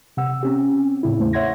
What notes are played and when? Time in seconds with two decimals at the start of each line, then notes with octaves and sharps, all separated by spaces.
0.17 C3 F#5 E6
0.43 C4 C#4 G4
1.03 A2 C#3 E4
1.18 E2 A3 C5
1.33 C#5 E5 F#5 C6 G#6 A#6